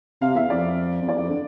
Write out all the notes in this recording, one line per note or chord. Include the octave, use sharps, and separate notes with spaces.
C3 F5
E2 E5
F2 D5
F2
E2 D5
F2
D3